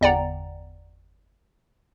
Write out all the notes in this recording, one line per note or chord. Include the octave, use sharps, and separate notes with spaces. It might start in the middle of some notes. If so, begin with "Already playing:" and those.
G1 E2 D5 F#5 G5 A#5